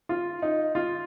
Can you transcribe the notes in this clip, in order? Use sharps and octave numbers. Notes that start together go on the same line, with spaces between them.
F4
D#4
F4